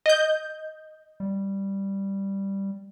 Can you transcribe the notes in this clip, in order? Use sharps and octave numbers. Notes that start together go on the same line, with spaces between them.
D#5 G6
G3